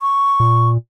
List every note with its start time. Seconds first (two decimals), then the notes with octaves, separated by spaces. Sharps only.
0.01 C#6
0.40 A#2